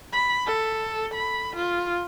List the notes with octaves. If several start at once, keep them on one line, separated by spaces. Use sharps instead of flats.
B5
A4
B5
F4